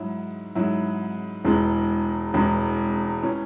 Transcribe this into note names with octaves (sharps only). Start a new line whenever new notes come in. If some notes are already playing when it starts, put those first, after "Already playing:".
Already playing: G#2 F#3 E4
G#2 F#3 E4
E1 E2 E3 G#3
E1 E2 E3 G#3
E3 C#4